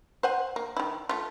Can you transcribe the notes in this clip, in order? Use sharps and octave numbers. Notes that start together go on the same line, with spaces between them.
C5 F#5 G#5
A#3
D#3 E4
A3 F4